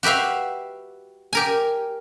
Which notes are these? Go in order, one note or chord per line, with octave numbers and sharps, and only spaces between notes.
F#4 G4 B4 E5 F5
G4 A#4 G#5